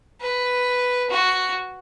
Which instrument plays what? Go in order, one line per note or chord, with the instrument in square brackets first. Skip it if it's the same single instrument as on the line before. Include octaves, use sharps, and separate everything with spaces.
[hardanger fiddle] B4
F#4